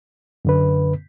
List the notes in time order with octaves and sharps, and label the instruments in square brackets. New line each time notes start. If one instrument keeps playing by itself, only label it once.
[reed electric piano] F#2 D3 B4